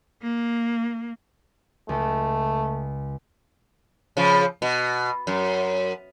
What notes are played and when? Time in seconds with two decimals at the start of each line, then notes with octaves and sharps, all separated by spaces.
0.23 A#3
1.89 C#2 A3
4.17 C#3 F3
4.62 B2
5.27 F#2